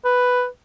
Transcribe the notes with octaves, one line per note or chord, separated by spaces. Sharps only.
B4